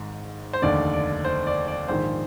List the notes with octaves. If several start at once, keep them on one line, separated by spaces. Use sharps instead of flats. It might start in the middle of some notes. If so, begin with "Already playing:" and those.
Already playing: G#1 G#2 D#3
C5
F1 D#2 D3 D5
D5
C5
D5
D5
A#1 G#2 D#3 C5